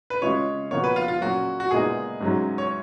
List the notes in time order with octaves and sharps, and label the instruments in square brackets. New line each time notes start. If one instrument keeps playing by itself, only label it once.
[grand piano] B4
[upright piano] C#3 G#3 C#4 F4 [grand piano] C#5
[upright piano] A#2 F3 B3 F#4 A#4 [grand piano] C#5
[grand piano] B4
F4
F4
[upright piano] A#2 F#3 C#4 [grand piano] F#4
[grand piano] F#4
[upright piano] A#2 G#3 B3 D#4 [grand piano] G#4
[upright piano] G#2 F#3 C#4
[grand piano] C#5